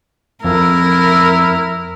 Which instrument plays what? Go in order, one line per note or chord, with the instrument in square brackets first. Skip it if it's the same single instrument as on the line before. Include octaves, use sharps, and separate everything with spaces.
[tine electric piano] F2 [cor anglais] E4 [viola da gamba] A#4